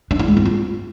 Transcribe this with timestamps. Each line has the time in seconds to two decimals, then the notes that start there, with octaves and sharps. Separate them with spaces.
0.11 D4
0.19 E4
0.28 G#3
0.37 C4
0.45 F4